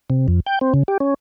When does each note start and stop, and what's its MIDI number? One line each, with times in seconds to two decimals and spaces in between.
0.10 0.27 48
0.28 0.40 41
0.47 0.59 79
0.61 0.73 60
0.74 0.83 49
0.88 0.98 67
1.00 1.14 61